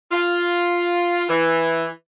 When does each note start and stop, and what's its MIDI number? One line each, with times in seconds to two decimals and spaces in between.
0.12 1.24 65
1.29 1.86 52